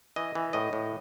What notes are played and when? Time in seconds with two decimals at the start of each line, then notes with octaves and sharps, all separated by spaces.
0.16 E3 D#5
0.35 E3
0.53 A2 D#5
0.73 A2